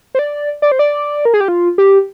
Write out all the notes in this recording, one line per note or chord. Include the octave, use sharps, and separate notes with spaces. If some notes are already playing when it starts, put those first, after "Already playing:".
C5
D5
D5
C5
D5
A#4
G#4
G4
F4
G4